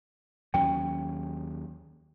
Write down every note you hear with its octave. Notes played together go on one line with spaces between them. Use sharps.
D#2 F#3 C#4 G5